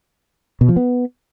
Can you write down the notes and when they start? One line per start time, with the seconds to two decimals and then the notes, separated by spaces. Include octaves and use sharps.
0.61 B2
0.69 F3
0.76 B3